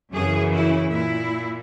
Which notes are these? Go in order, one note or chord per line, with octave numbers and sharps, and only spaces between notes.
F#2 C#3 E3 G#4
E4
A#2 E4